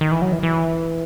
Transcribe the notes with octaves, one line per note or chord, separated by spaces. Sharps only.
D#3
E3
F#3
E3
E3